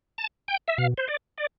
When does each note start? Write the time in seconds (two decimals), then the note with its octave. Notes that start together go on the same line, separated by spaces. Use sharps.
0.18 A5
0.48 G5
0.68 E5
0.78 B2 F5
0.98 C5
1.08 D5
1.38 D5